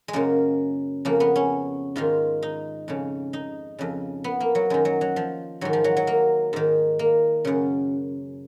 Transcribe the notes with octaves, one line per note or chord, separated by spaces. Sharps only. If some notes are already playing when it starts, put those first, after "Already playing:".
G#3
F#2 C#3 A#3
F2 C#3 A#3
B3
C#4
G#2 D#3 F4
D#4
F2 C#3
D#4
F2 C#3
B3
A#3
F#3
F#2 D#3 G#3
F#3
F#3
F3
G#2 D#3 F#3
F3
F#3
F#3
A#3
G#2 D#3
A#3
F#2 C#3